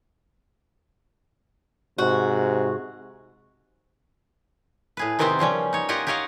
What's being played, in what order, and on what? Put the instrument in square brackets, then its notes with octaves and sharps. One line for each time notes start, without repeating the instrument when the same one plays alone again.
[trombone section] G#2 C3 [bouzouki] F#4
[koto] A2 G#4 B4
C3 D#3 B3 C4 G4 C5
C#3 F3 G3 C#4
D#4 C#5
F4 G4 A#4 D#5 F#5 G#5
G4 A#4 C#5 D#5 F5 F#5